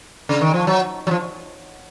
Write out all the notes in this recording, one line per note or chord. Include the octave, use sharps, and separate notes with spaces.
C#3
D#3
F3
F#3
F#3
F3